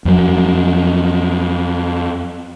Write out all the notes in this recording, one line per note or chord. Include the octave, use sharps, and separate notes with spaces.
F2 F#3